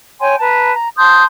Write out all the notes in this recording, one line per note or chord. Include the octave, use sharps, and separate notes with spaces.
C#5 G5 G#5 C6
B4 A5 A#5
A#5
A5 C6 D#6 G6